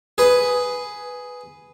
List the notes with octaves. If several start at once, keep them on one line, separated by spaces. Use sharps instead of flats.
G#4 B4